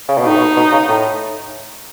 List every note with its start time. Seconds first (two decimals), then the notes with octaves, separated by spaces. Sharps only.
0.08 C#3
0.18 B2
0.25 A2 D#4
0.38 B2
0.56 B2
0.72 C#3
0.88 A2